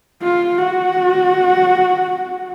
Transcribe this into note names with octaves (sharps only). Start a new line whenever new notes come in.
F4
F#4